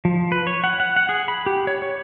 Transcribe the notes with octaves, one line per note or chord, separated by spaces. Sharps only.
F3
B4
C#5
F#5
F#5
F#5
G#4
B5
G4
C#5
C#5